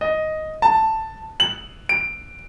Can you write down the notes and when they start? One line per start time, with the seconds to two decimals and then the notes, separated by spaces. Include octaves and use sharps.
0.01 D#5
0.62 A5
1.40 F#7
1.89 D7